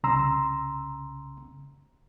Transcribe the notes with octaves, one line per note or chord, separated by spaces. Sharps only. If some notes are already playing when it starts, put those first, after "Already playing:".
C2 C#3 A#5 C6 E6